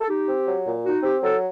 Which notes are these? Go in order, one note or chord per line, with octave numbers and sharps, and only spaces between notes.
A4
D#4 G4
C4
F#3
A#2
D#4 F#4
C4 G4
F#3 A4